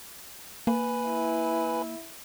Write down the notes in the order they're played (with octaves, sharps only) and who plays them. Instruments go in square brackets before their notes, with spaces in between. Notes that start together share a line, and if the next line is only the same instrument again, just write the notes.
[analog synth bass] A#3 [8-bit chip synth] B4 G#5 B5
[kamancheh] E4